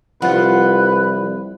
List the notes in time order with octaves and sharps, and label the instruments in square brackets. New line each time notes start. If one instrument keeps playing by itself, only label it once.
[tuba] C2 [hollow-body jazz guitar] F3 F4 [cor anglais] B4 [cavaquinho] F#5